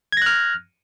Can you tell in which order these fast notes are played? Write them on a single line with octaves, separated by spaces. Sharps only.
G#6 A#6 F#6 F6